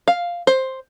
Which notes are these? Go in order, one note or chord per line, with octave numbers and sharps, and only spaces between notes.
F5
C5